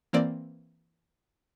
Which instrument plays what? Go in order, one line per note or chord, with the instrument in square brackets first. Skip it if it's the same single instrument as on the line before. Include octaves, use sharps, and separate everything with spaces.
[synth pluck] E3 A#3 C4 D5